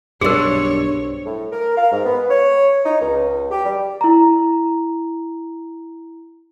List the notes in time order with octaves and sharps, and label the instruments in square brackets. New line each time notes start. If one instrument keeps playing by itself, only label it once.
[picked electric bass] B1 G2 [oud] C4 D4 [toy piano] G#4 A#4 [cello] C#5
[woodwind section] A2
A#4
F5
G#2
B3
C#5
D#4
C#2
G4
G3
[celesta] E4 A#5